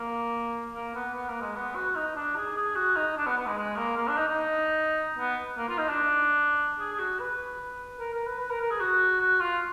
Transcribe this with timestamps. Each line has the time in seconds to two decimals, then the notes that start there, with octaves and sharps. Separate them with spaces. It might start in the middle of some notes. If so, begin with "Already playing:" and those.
Already playing: A#3
0.75 A#3
0.95 B3
1.14 B3
1.29 A#3
1.41 G#3
1.56 B3
1.75 F#4
1.96 D#4
2.16 D4
2.36 G#4
2.56 G#4
2.76 F#4
2.96 D#4
3.17 D4
3.26 B3
3.37 B3
3.46 G#3
3.57 G#3
3.76 A#3
3.96 A#3
4.08 D4
4.17 D#4
4.27 D#4
5.18 B3
5.58 A#3
5.68 F4
5.78 D#4
5.89 D4
6.79 G#4
6.92 G#4
6.99 F#4
7.19 B4
7.99 A#4
8.14 A#4
8.27 B4
8.40 B4
8.50 A#4
8.61 A#4
8.70 G#4
8.80 F#4
9.20 F#4
9.40 F4